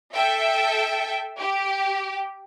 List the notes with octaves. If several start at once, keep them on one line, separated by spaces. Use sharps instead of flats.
A4 E5 G5
G4